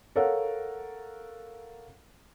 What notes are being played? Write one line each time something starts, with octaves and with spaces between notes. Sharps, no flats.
A4 A#4 C#5 F5 F#5